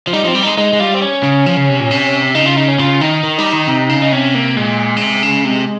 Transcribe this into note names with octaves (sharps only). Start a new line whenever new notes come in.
F3
G3 D#4
F3 C4
G3
G#3 D#4
G#3 D#4
G#3
G3 F4
C4
C#4
C#3
F3
C#3
C3
A#2
C3
C#3 D#4
F4
D#4
C#4
C#3 F4
D#3 D#4
D#3
G3
D#3
C3
C#3
D#4
C3 C#4
A#3
A#2 G#3
C#3
C3
C#3
C3